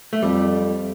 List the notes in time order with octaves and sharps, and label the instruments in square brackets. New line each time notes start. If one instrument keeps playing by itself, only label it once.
[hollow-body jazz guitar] A3
[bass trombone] F2 [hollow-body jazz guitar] G3